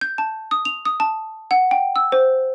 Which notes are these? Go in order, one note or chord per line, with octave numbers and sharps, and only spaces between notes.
G6
A5
D#6
F7
D#6
A5
F#5
G5
E6
C5